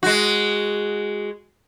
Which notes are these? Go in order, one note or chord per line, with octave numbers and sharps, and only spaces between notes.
G#3 F#4